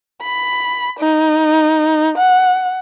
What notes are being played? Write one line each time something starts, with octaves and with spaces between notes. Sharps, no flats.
B5
D#4
F#5